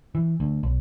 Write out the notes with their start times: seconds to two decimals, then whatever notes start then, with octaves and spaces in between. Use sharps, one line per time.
0.15 E3
0.40 D2
0.63 B1